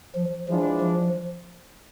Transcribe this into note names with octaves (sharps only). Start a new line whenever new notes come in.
F3
E3 F3 G#3 D4 F4
F3